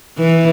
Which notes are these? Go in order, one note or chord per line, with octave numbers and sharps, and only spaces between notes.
E3